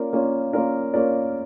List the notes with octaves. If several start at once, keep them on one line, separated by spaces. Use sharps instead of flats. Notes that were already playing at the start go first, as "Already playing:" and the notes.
Already playing: A#3 C#4 F4 A#4 D5
A#3 C#4 F4 A#4 D5
A#3 C#4 F4 A#4 D5
A#3 C#4 F4 A#4 D5